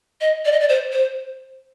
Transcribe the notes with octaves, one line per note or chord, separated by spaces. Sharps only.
D#5
D5
D#5
D5
C5
C5